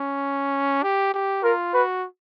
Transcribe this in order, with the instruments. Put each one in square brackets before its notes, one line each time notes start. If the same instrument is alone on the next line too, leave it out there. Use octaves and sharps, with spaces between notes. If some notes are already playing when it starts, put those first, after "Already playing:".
Already playing: [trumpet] C#4
G4
G4
[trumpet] F4 [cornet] A#4
[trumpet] F#4 [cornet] B4